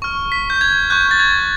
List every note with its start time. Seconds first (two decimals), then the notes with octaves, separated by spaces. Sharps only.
0.02 C#6 F6
0.32 B6
0.50 G6
0.61 G#6
0.90 C#6 F#6 G6
1.11 A6
1.20 G#6